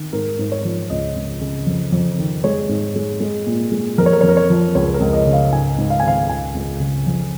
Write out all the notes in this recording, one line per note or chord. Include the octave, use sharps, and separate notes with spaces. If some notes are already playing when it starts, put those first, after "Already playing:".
Already playing: D#3
G#2 A#4
G#2
C#5
F3
C#2 D#5
C#2
C#3
F2
F2
D#3
G#3 C#5
G#2
G#3
G#3
A#2
G#3
F2 A#4
C#5
A#4
F2 C#5
A#4
C#5
F3
C#2 C#5
A#4
C#2
D#5
C#3
F5
G#2 G#5
G#2
F5
G#5
D#3 F5
C#2 G#5
C#2
C#3
F2